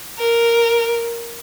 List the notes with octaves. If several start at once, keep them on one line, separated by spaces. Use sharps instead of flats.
A#4